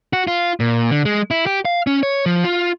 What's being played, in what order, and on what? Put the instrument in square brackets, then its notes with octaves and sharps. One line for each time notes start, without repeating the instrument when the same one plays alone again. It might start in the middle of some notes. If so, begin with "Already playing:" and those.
[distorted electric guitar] F#4
F4
A#2
D3
G#3
E4
G4
F5
C#4
C#5
F3
F4